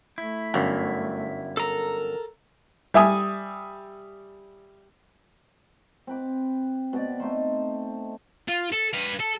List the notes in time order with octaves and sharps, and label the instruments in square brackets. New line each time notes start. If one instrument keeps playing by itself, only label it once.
[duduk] A3 [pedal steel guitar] E4
[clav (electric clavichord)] G1 F#2
[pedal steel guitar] A4 A#5 [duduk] A#4
[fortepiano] G3 E5 G#5 D#6
[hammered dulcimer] C4 B4 D6
B2 C4 D5
A3 D#4 C5
[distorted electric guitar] F4
A4
B4 F5
A4